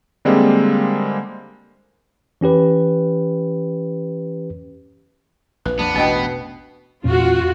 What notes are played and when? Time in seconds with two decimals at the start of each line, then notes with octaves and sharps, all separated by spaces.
0.25 D3 G3 G#3 A#3 C4
2.41 E3 C#4 G4 B4
5.66 A#1 B4
5.79 A#1 F2 B3 D4
5.96 A1 E2 B2 D4 D#5 G5
7.04 E2 A#2 C#4 F4 F#4